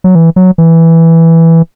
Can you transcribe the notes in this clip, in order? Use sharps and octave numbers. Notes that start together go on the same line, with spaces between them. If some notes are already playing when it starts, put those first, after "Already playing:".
F#3
E3
F#3
E3